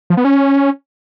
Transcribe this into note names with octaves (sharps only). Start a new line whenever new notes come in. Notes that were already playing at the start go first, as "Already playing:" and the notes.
F3
B3
C#4